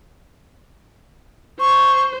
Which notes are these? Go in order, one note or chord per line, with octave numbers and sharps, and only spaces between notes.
C5 C#6